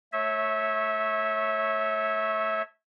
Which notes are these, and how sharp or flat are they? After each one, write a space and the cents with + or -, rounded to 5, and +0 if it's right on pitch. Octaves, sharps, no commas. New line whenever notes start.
A3 +0 C#5 -20 E5 -20